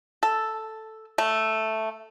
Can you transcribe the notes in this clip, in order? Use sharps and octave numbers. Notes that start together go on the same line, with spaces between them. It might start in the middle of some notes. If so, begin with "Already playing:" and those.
A4
A3